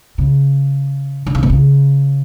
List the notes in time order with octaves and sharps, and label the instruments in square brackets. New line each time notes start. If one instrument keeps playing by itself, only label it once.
[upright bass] C#3
D3
C#3
B2
C#3